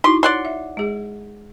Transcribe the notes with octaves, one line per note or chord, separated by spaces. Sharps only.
D#4 E4 F#4 C6
C#5 D5 F#5 C6
E5
G#3 G#4